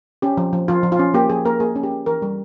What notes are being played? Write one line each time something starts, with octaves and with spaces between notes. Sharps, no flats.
C#4 G4
F3
F3
F3 F4
F3
F4
C#4
A#3 G4
F3 G#4
A#3 A#4
A#3 G#4
C#4
G4
C#4
E3 A#4
G3